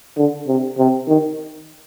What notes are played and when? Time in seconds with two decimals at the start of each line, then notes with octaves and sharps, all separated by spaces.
0.17 D3
0.48 C3
0.78 C3
1.08 D#3